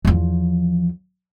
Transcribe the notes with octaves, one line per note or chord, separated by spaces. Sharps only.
E2 F3